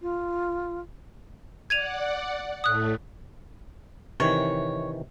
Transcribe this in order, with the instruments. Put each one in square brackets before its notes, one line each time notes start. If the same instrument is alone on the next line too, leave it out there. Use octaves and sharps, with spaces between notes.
[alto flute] F4
[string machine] D5 F#5 [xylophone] G#6 D#7 F7
[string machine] A2 A3 [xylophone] D#6 F#6
[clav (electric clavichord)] C3 D#3 E3 [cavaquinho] C#5